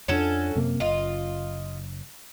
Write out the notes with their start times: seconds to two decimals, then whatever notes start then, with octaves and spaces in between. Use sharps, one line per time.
0.08 F2 F3 C#4 D4 F#4 A4
0.56 F#2 C3 A#3
0.80 F#1 F4 D#5